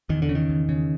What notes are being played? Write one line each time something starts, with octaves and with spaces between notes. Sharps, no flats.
E2 D#3
D3
C#3
D#3
E2
C#3